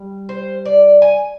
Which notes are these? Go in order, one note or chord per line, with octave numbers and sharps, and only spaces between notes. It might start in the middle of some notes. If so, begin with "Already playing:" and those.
Already playing: G3
C5
D5
G#5